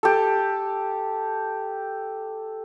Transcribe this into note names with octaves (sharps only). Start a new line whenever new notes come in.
G4 A4